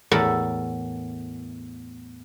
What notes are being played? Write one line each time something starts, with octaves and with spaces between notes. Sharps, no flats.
E2 A2 A4 A#4 B5